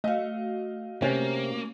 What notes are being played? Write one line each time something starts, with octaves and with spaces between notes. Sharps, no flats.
A3 F#4 D#5 F5
C3 A#3 C#4